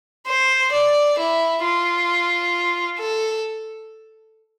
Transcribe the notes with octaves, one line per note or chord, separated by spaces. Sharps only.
C5
D5
E4
F4
A4